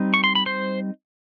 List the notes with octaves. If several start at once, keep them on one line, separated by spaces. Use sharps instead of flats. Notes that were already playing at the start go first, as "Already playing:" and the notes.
Already playing: G3 C4 D#4
C#6
C6
B5
C5 C6